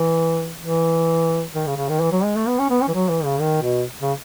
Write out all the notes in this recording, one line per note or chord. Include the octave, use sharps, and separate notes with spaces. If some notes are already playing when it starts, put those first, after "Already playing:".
Already playing: E3
E3
D#3
C#3
C#3
D#3
E3
F#3
G#3
A3
B3
C#4
B3
C#4
E3
F#3
E3
C#3
D#3
B2
C#3